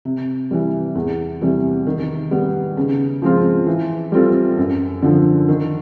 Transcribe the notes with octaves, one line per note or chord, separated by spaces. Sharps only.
C3
E3 G3
E2
C3 E3 G3
D#3
G3 B3
C#3
F3 G#3 C4 F4
E3
G3 C4 F4 A4
F#2
D3 F3
D#3